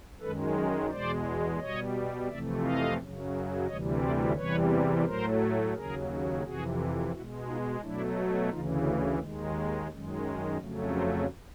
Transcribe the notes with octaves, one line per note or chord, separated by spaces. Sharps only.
F#2 D#3 G#3 A4 B4
G#4 A#4
E2 B2 G#3 C5 D5
B2 G3 C#5 D#5
F2 C3 E3 A3 D5 E5
D#5 F5
F#2 C#3 F#3
D2 C3 E3 G3 C#5 D#5
C5 D5
E2 C3 E3 G3 B4 C#5
A2 F#3 A3 A#4 C5
D#2 C#3 F#3 G#4 A#4
F2 C3 E3 F#4 G#4
B2 G#3 E4 F#4
D#4 F4
B2 F#3 A3 D4 E4
D2 C#3 E3 D#4 F4
D#2 D#3 G#3
F#2 D#3 G#3
F2 C#3 F#3 A3
A#4 C5